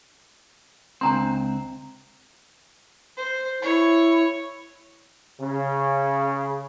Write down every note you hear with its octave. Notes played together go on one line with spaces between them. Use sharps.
C#2 C4 D4 A#5 C6
C5
E4 C#5
C#3